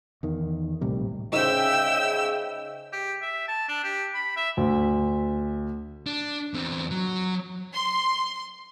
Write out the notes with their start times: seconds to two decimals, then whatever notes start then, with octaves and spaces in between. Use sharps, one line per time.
0.23 E2 D#3
0.81 A#1 A2 C3 G3
1.33 C#3 D#4 C5 E5 G5 E6
2.93 G4
3.22 E5
3.48 A5
3.68 D4
3.84 G4
4.14 B5
4.37 E5
4.57 D2
6.06 D4
6.54 E2 C4
6.91 F#3
7.74 C6